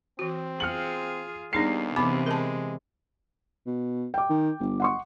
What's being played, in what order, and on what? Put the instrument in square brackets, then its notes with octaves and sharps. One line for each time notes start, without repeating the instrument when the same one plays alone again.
[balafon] E3 F#4 [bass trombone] C4
[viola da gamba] F4 G#4 [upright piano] F6 C#7 F#7
[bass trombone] D#2 [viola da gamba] G3 B3 [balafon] D4 D#4 G#4 [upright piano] C7
[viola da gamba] C3 E3 [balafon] B3 D6 [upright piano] B5
[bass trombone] G#3 [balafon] A#4 A5
[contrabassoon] B2
[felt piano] G5 D6
[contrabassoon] D#3
G1
[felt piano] F#5 C6 C#6